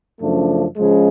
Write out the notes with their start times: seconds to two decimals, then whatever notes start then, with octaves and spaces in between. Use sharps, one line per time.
0.21 F#2 C#3 F3 A3 D4
0.77 C#2 C#3 F3 G#3